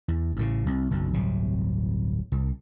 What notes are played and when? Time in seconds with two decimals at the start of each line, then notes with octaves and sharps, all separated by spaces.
0.08 E2
0.36 A1 A2 C#3
0.66 C2
0.91 F#1 B1
1.13 D1 G1 C3 F#3
2.32 C2